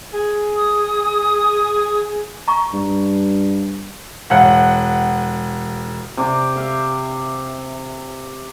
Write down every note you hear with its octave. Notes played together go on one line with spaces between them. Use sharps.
G#4
D#6
A#5 C#6
G2
E1 F#5
C3 G4 D6
E5 F5